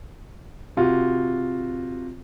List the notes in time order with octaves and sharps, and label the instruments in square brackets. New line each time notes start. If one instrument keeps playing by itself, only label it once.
[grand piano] C3 F4 F#4